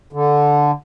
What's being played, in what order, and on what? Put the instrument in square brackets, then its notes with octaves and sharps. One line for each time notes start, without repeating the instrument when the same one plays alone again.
[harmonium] D3